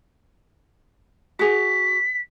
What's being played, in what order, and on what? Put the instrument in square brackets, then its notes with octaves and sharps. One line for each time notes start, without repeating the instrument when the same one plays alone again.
[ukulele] F#4 G#4 [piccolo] B6